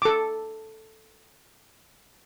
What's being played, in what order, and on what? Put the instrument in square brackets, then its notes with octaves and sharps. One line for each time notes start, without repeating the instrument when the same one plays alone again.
[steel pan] A4 D6